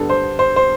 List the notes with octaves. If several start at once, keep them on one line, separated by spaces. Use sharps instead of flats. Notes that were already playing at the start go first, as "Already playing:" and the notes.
Already playing: G2 D3 G3 B3 A4
C5
C5
C5